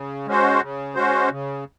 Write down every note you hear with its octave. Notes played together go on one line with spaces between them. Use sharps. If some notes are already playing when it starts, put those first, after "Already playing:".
Already playing: C#3
G#3 C#4 F#4 C5
C#3
G#3 C#4 F#4 C5
C#3